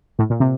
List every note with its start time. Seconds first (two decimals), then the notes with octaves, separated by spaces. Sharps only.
0.19 A2
0.30 A#2
0.40 C3